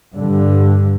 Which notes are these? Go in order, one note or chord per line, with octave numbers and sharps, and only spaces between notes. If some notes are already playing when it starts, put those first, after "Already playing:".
G2 D3